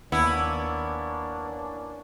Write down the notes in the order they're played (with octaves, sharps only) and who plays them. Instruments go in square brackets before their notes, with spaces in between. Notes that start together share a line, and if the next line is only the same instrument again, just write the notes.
[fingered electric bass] D#2 [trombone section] A#3 C#4 D4 [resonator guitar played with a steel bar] B3 [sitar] E4